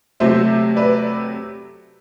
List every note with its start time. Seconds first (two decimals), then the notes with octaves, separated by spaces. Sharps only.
0.20 C3 F#3 A3 C5 E5
0.76 B4 D5